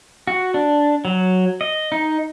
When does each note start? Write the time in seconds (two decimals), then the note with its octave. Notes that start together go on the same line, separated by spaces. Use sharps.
0.27 F#4
0.54 D4
1.05 F#3
1.61 D#5
1.92 D#4